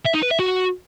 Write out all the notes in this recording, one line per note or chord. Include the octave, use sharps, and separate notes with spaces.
E5
D#4
B4
E5
F#4